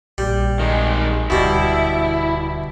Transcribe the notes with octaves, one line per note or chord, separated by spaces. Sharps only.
A#1 G3
D#3 G#3
D1 D2 B2 G3 E4